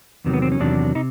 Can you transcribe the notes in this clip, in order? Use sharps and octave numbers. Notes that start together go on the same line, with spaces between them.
E2 C3 D#3 F#3
B3
C4
C#4
E2 C3 D#3 F#3 D4
C3 D#4